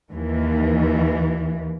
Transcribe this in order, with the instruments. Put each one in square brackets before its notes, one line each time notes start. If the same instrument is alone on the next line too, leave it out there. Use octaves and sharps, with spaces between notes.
[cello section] D#2 E3